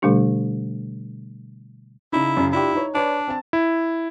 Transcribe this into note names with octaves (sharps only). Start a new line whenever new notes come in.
B2 D3 G3 A3 D4 G4
C#3 D#4 E4
F#2 C#3
D4 E4 F4 G4
D#4 C#5
D4 B4 C#5 D5
C4 A5
E4